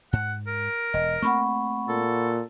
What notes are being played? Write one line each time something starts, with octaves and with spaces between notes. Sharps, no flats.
G#2 F#5
A#4
E1 D#5
A3 A#3 C4 F#5 B5 C#6
A#2 A4